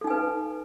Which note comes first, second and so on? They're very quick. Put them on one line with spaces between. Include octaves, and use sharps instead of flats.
A4 D#4 G#5 B4